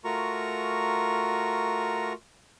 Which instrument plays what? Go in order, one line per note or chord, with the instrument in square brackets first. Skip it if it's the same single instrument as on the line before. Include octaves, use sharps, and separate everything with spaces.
[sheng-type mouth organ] A3 F4 F#4 A#4 A#5 C#6